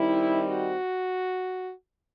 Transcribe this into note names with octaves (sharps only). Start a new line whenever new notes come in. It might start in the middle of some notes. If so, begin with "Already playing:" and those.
Already playing: D#3 G3 C4 D#4 E4
F#4